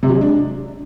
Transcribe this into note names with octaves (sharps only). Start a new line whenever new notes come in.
C3
F#3
G#3
D4